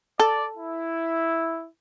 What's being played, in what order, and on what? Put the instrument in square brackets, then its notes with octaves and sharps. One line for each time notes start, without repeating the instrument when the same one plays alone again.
[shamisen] A4 [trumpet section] D5
[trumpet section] E4